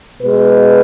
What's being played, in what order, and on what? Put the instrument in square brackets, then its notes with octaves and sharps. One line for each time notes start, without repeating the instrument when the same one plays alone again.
[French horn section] B2 G#3 B4